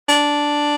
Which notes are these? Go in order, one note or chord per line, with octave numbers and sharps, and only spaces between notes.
D4